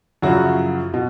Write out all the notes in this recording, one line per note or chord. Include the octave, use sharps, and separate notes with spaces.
F#2 C#3 F3 E4 F#4
B2